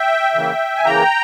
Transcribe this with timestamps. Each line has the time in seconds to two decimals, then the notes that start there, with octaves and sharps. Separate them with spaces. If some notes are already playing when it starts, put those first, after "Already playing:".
Already playing: E5 G5
0.34 C#3 E3 A#3
0.76 G#5
0.85 C#3 E3 A#3 G5 A#5